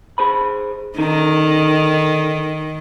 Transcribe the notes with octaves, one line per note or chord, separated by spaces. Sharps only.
G#4 C5 B5
D3 D#3 D#4